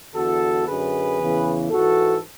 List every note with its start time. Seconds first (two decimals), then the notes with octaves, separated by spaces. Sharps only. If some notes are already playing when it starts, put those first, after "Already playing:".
0.15 E2 D3 F#4 A4
0.67 F#2 D3 G#4 B4
1.20 E2 C#3 E3
1.70 G#2 E3 F#4 A4